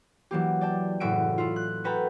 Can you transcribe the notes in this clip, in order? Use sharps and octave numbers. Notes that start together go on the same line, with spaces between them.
E3 F#3 A#3 G4
D5 G5 A5
F#1 A2 F#4 E5 D7
E4 F4
F#6
F#4 A4 B4 G5 A#5 B5